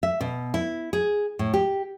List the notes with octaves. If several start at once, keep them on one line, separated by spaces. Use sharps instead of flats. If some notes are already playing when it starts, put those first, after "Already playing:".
E5
B2
E4
G#4
A2
G4